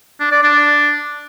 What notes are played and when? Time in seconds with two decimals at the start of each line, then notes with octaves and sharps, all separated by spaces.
0.20 D4
0.31 D5
0.43 D4